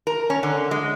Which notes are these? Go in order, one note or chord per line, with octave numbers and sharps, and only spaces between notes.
A#4
C#4
D3
G#3